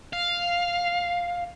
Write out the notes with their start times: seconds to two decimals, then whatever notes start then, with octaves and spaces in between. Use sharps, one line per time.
0.13 F5